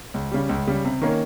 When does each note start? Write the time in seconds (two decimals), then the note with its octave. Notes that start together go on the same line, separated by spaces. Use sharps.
0.14 C#2
0.32 C#3 G3
0.49 C#2
0.67 C#3 G3
0.85 C3
1.02 D#3 A#3 C#4